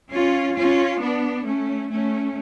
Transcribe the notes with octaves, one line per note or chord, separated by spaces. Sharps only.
C#4 F4
C#4 F4
B3 D4
A3 C#4
A3 C#4